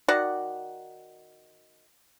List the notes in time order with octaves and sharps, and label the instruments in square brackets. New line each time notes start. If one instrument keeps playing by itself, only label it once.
[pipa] D#3 F#4 D5 F#5